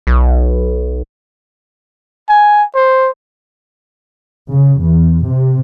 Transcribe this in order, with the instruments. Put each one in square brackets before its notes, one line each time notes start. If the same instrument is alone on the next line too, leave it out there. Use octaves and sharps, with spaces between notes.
[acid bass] B1
[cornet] G#5
C5
[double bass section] C#3
E2
C3